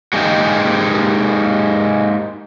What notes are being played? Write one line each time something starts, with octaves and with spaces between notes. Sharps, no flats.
F#3 G#3 A#3 D#4 G4 G#4